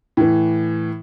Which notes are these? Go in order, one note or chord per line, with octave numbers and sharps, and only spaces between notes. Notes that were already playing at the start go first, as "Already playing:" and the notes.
A2 E3